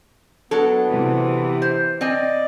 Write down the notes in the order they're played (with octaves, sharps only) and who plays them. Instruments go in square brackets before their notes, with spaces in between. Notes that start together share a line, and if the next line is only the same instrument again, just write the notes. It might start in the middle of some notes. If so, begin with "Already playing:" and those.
[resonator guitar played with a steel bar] F#3 D4 A4 [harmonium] B3
[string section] C3 E3
[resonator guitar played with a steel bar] C5
[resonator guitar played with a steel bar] C4 G#5 [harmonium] D5 D#5